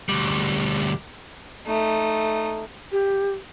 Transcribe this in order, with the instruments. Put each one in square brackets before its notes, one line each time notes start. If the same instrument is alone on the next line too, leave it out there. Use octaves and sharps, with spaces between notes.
[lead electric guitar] D2 G3
[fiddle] A3 D#4
[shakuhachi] G4